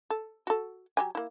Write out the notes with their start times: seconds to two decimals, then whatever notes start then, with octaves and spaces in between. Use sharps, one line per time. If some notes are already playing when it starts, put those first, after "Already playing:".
0.10 A4
0.47 F#4 A4
0.97 F#3 G4 G#5
1.15 A#3 E4